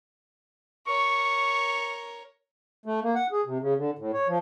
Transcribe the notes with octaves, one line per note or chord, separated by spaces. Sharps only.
A#4 C#5 C#6
A3
A#3
F#5
G#4
C3
C#3
D3
A2
C#5
F3